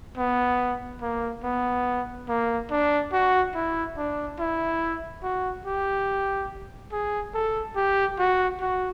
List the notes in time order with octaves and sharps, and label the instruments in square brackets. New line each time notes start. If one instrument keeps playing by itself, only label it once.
[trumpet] B3
A#3
B3
A#3
D4
F#4
E4
D4
E4
F#4
G4
G#4
A4
G4
F#4
F#4